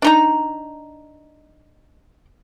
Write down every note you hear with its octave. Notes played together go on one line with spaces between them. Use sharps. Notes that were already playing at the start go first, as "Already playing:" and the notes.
D4 D#4 A#5